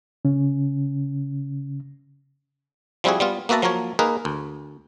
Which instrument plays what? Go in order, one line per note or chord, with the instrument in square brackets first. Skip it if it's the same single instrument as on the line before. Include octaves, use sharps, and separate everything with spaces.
[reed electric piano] C#3 C#4
[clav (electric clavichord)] F3 G3 C4 E4 F#4 G#4
G3 B3 F4
A#3 B3 F#4 E5 A5 A#5
F3 F#3 A#3 A#4 C#5
A#3 D#4 G#4 A#4 B4
D2